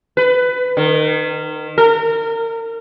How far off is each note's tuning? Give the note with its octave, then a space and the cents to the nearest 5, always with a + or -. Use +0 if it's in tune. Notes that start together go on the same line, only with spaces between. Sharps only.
B4 +20
D#3 -25
A#4 -30